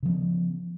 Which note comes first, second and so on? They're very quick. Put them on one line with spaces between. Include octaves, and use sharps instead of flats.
C#3 F3 B3